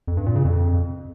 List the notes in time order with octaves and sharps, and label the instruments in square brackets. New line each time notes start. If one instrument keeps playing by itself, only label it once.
[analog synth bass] F2
G2
A#2
C#3
F2